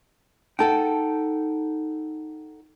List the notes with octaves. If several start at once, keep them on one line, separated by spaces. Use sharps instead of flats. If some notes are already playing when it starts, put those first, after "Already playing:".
D#4 A4 F#5 G5 A5